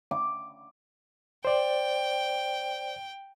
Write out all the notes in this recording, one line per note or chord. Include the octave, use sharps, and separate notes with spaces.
D6
C5 D5 G5